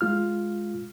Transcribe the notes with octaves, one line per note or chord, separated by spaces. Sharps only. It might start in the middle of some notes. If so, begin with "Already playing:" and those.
G#3 F4 F6